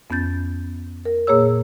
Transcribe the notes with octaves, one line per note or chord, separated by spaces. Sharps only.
F2 B3 C#4 G6 A6
A#4
A#2 A#3 G#4 C#5 E6